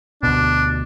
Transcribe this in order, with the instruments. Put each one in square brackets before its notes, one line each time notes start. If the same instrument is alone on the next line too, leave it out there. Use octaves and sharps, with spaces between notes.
[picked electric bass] D2 B2 [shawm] D4